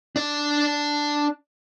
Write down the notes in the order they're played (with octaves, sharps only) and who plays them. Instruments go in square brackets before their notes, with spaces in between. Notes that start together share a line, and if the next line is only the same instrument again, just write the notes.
[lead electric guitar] D4 D5